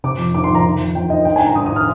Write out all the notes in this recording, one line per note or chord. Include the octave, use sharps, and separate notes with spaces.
C3 D6
F2
D#3 D6
C6
F2
A#5
D#3
F2
F2 G5
D#3 D#5
D#3 G5
G#5
G2
A#5
G2 D#6
D#6
D#3 F6